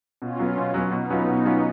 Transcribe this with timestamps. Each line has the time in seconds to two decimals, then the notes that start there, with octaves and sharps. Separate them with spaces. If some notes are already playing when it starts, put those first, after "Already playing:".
0.22 B2 C#4 F4
0.39 F#3 B3
0.57 B2
0.74 F#3 B3
0.92 B2 B3 D#4
1.10 F#3 C#4 F4
1.27 B2
1.45 F#3 C#4 F4